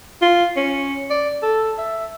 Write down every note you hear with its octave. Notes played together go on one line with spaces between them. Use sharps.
F4
C#4
D5
A4
E5